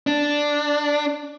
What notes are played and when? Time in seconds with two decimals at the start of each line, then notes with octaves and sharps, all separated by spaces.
0.07 D4